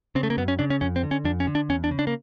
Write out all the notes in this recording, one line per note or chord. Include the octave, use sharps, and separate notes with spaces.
C#3 C4
A3
A#3
F#2 B3
C#4
C#3 D4
C#4
F2 C#4
C4
D3
C#4
F2 D4
C#4
D3
D4
E2 C#4
D4
C#3
D4
A#3